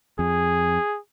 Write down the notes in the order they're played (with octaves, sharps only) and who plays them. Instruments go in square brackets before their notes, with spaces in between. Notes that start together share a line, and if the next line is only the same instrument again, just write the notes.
[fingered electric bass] F2 [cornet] G#4